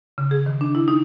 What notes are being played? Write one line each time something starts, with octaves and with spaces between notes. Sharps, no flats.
C#3
G#4
D#3
D4
E4
D#4